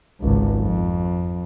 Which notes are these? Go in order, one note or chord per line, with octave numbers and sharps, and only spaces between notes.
G#1 C#2
F2